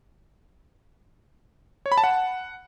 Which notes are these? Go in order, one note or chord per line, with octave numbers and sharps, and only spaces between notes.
C#5
B5
A5
F#5